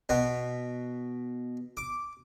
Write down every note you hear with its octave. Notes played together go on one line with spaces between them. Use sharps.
B2 B3
D6